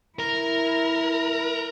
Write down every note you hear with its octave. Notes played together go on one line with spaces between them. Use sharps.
E4 A#4